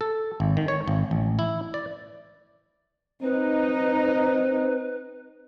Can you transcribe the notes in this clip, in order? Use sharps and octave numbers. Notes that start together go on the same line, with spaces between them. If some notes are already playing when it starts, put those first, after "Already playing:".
A4
G#1
D#3
C#5
G#1
A1
E4
D5
C4 D#4 B4